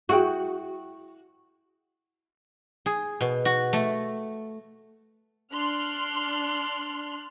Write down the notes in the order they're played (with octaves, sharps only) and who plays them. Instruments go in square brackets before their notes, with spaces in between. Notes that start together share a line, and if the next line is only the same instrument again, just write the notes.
[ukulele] E4 G#4 G5 [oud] F#4
[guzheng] G#4
B2
F#4
A3
[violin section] D4 C6 F6 F#6